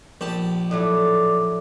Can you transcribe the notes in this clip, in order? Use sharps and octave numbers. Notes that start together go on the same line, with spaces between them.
A#1 G4 A5
A2 F#3 A3 D5